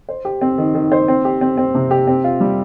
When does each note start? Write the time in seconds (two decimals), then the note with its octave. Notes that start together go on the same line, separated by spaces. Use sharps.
0.09 C5
0.25 G4
0.41 C4
0.58 D#3
0.74 D#3
0.92 C5
1.08 C4
1.25 G4
1.41 C4
1.57 C4
1.75 C3
1.91 G4
2.07 C4
2.24 F4
2.40 G3